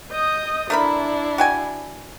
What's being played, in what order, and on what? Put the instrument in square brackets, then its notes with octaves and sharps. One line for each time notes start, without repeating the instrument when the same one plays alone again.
[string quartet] D#5 D#6 G6
[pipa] A3 A#4 B5 [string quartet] D4 E4
[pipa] F#4 G5 G#5